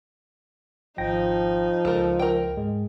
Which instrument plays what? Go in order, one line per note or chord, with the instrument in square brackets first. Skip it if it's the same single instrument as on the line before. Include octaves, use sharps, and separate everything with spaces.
[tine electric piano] G#1 G5 A#6 [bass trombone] F3 [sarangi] D#4
[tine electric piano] C#2 [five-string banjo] A4 A#4
[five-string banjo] A#4 G5
[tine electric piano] G#2 G#3